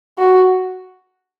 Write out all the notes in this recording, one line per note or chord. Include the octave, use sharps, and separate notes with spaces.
F#4